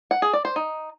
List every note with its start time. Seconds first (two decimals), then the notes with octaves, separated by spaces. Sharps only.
0.11 F#5
0.22 G#4
0.33 D5
0.45 C5
0.56 D#4